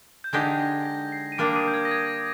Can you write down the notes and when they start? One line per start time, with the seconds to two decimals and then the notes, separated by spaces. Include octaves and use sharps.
0.24 G6
0.33 D3 G#3 D#4 G4 G#6
0.59 A#6
0.85 A#6
1.12 C7
1.32 D#7
1.38 G3 A#3 D4 D6 D7
1.56 D#6 D#7
1.67 G6
1.74 G#6
1.85 A#6
1.91 G#6